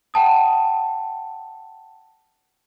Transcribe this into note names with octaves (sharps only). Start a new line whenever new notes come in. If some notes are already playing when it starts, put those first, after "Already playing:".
F#5 G5 A5 D#6